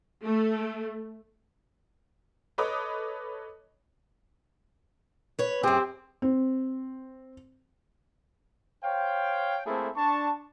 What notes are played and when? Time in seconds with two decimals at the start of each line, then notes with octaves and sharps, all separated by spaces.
0.23 A3
2.58 A4 B4 C#5 D#5 D6 D#6
5.39 B4 C#5
5.63 F#2 C4 G4 G#4
6.22 C4
8.84 C5 C#5 F5 G5
9.66 A3 A#3 C4 E4 G#4 A4
9.96 D4 A5 C#6